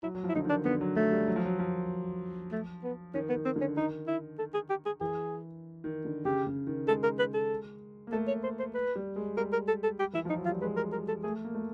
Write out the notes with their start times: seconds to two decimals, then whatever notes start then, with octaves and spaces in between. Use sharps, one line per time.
0.03 F#3 E4
0.15 F#3
0.24 F3
0.29 E4
0.35 D3 D#4
0.45 D#3 D4
0.65 D3 B3
0.81 F#3
0.96 F#3 A3
1.12 G3
1.28 F#3
1.36 F3
1.46 F#3
1.59 F3
2.52 A3
2.83 B3
3.14 D#3 C#4
3.29 B3
3.35 D#3
3.45 C4
3.56 D3
3.61 C#4
3.77 D#3 D#4
4.07 E4
4.39 A4
4.54 G#4
4.70 G4
4.86 G#4
5.01 E3 G#4
5.84 D#3
6.05 D3
6.25 C#3 G4
6.47 C#3
6.67 D#3
6.87 G#3 A4
7.03 A#4
7.19 B4
7.34 A4
8.07 A#3
8.12 A3 A4
8.28 C#5
8.43 C5
8.59 C5
8.75 B4
8.96 G3
9.16 G#3
9.37 G3 A#4
9.53 A#4
9.68 A4
9.84 A4
10.00 G4
10.13 E3 E4
10.25 F3 D#4
10.37 F#3
10.45 F4
10.49 G3
10.61 G#3 B4
10.77 A#4
10.93 A#4
11.08 A4
11.23 A3 G#4
11.44 A#3
11.55 A3